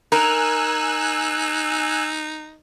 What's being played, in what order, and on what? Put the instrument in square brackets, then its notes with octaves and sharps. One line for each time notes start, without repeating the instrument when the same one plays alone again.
[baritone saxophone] D#4 [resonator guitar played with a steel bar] A#4 [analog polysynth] G#5 E6 F#6